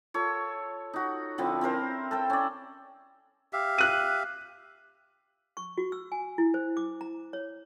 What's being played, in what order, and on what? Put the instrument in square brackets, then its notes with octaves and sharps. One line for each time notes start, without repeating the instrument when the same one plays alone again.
[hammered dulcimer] F4 A4 C#5
D#4 F#4
D3 F3 C4 E4
C4 E4 A#4 C5
A4 C5 G5
C#4 D5
[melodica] G4 E5 F5
[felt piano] F#6 D#7
[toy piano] C#6
F#4
E6
G#5
E4
C5
D6
A#5
C#5